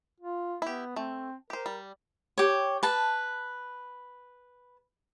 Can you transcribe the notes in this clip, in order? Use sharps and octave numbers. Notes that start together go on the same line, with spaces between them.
F4
B3 E4 G4
A3 C4
G4 A#4 C5
G3
G4 C#5
B4 A5